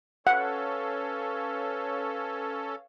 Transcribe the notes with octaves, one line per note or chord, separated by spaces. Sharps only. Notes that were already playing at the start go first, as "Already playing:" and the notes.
C#4 A4 B4 C#5 F5 F#5